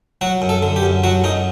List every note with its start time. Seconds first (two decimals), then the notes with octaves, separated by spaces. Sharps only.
0.21 F#3 F#4
0.42 F#2
0.49 A4
0.63 D3
0.76 G4
0.83 F#2
1.04 F#3 F#4
1.24 F#2 D#4